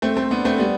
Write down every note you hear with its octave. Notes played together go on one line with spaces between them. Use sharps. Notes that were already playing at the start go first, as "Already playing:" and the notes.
A3 C4
A3 C4
B3 D4
A3 C4
G3 B3